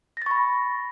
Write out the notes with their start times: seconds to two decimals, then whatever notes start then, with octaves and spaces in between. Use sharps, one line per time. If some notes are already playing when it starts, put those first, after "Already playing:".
0.17 A#6
0.22 A6
0.26 C#6
0.31 B5